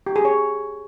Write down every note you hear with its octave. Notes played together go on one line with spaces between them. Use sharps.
G4
G#4
C#5